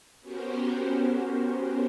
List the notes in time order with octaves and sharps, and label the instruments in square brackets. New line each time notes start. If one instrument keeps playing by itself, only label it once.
[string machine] B3 C#4 F#4 G4 A#4 C5